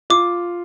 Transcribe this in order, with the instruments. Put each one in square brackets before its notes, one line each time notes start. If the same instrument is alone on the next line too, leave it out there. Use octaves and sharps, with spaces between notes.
[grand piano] F4 [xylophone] D6